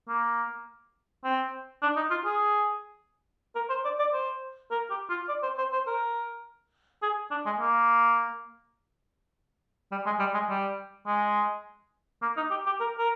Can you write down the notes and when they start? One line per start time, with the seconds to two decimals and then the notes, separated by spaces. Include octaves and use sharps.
0.09 A#3
1.24 C4
1.82 D4
1.96 D#4
2.11 F4
2.25 G#4
3.55 A#4
3.69 C5
3.85 D5
3.99 D5
4.13 C5
4.71 A#4
4.90 G4
5.09 F4
5.29 D5
5.43 C5
5.58 C5
5.73 C5
5.87 A#4
7.02 G#4
7.31 D4
7.46 G#3
7.60 A#3
9.92 G3
10.06 G#3
10.19 G3
10.34 G#3
10.49 G3
11.07 G#3
12.22 A#3
12.37 D#4
12.51 G4
12.66 G4
12.80 A#4
12.98 A#4